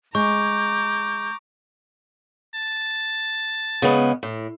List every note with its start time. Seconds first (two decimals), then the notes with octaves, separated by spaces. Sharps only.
0.15 G#3 A#5 C#6 D6 G6
2.55 A5
3.82 C#3 G#3 B3
4.23 A2